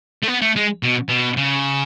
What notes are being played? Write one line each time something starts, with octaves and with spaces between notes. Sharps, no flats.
A3
B3
A3
G#3
B2
B2
C#3